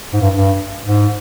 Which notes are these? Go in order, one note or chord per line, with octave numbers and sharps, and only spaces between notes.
G#2
G2
G2
G#2